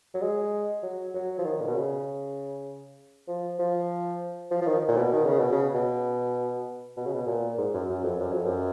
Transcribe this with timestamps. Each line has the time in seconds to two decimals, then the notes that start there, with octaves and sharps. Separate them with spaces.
0.14 F#3
0.22 G#3
0.83 F#3
1.14 F#3
1.39 F3
1.44 D#3
1.61 A#2
1.68 B2
1.75 C#3
3.28 F3
3.59 F3
4.51 F3
4.62 F3
4.67 D#3
4.88 A#2
4.97 B2
5.13 D#3
5.26 C#3
5.39 B2
5.52 C#3
5.74 B2
6.97 B2
7.06 C#3
7.14 B2
7.27 A#2
7.58 G#2
7.74 F#2
7.89 F#2
8.04 F2
8.20 F#2
8.32 F2
8.46 F#2